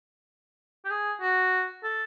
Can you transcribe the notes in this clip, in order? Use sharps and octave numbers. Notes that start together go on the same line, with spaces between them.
G4
G#4
F#4
A4